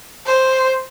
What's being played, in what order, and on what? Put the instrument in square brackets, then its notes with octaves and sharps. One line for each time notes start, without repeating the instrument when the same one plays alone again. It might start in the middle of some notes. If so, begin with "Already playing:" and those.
[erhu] C5